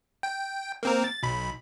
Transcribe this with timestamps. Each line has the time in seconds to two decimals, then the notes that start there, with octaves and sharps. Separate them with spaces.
0.23 G5
0.83 A#3 C4 A#4
1.04 A6
1.23 B1 B5